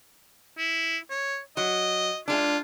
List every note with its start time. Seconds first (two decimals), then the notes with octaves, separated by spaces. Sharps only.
0.58 E4
1.10 C#5
1.57 F#3 D#5
2.28 G#3 D4 F4